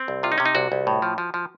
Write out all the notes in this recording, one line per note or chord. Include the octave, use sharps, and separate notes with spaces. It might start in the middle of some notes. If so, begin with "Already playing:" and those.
Already playing: C4
C2
C3 F4
D#4
C3 C#4
D#4
C2 F#4
C2
A2
F3
F3
F3